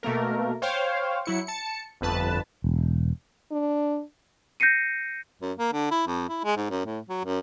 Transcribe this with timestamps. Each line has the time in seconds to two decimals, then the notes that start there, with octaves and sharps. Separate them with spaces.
0.03 B2 A3 A#3 A#4
0.62 C5 C#5 F5 G5
1.25 F#3 E4 C#7
1.47 A5 C#7
2.01 G1 F2 B4 A5
2.64 E1
3.52 D4
4.60 G6 A#6 C7 C#7 D#7
5.41 F#2
5.58 A#3
5.73 D3
5.91 E4
6.07 F2
6.29 E4
6.44 G#3
6.57 G#2
6.70 F#2
6.85 A2
7.09 F#3
7.25 F#2